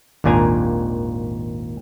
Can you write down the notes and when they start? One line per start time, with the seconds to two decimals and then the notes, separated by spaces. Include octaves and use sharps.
0.24 G#1 D#2 A#2 D4 G#5 A#5